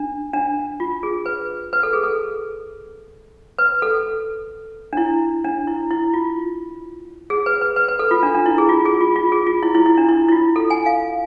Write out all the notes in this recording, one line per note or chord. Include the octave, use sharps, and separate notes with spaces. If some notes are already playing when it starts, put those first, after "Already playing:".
Already playing: D4
D4
F4
G#4
B4
B4
A4
G#4
A4
B4
A4
D4
E4
D4
E4
E4
F4
G#4
B4
B4
B4
B4
A4
F4
D4
D4
E4
G#4
F4
G#4
F4
F4
G#4
F4
E4
E4
E4
D4
E4
E4
F4
A4
G#5
F5